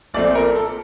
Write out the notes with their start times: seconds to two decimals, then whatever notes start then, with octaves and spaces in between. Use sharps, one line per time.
0.14 A#1 A#2 A3 C4 D5
0.35 A#4
0.56 A4